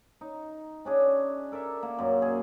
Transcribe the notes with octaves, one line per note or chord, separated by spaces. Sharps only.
D#4
C#4 D4 G#4
A4 A#4 D5 E5
A#3
F#2 A#2 A#3
G#4